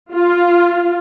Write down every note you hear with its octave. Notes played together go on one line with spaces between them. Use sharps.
F4